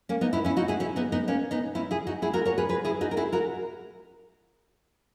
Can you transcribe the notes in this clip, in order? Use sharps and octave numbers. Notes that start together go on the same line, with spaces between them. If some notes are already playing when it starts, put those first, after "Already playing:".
A#3 C#4
B3 D#4
C#4 E4
C#4 E4
D#4 F#4
E4 G#4
C#4 E4
B3 D#4
B3 D#4
A#3 C#4
B3 D#4
C#4 E4
E4 G#4
D#4 F#4
E4 G#4
F#4 A#4
A#4 C#5
G#4 B4
G#4 B4
E4 G#4
D#4 F#4
A#4
E4 G#4
F#4 A#4